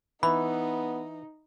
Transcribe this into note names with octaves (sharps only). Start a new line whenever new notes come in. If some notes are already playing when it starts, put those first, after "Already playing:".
E3 B3 D#4 B5